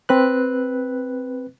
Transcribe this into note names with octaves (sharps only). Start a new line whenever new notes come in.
C4 B4 F#6